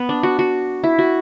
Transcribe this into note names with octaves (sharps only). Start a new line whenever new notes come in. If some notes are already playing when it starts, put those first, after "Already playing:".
Already playing: B3
D4
F#4
F#4
E4
F#4